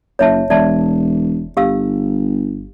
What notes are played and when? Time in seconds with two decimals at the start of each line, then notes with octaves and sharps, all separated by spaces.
0.19 F#1 C#5 E5 A5
0.50 E1 D5 E5 A5
1.57 G1 G4 F5 E6